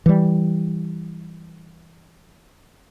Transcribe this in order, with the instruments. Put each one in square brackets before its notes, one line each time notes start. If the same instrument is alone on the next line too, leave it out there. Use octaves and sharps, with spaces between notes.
[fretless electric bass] E3 G3